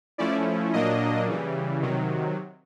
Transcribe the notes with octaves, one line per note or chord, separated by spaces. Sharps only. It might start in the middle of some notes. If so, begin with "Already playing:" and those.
F3 A3 C#4 E4 D5
A#2 F#3 A#3 D4 D#5
C#3 E3 G3
C3 D#3 F#3